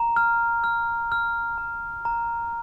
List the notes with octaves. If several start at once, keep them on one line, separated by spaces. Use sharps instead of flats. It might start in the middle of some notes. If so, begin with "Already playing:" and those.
Already playing: A#5
F6
F6
F6
A#5
A#5